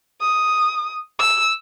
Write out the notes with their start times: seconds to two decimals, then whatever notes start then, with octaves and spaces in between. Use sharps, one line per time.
0.21 D#6
1.19 E6